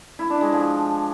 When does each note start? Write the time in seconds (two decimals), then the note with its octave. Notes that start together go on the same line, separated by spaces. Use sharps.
0.19 E4
0.30 D4
0.41 G#3
0.52 F3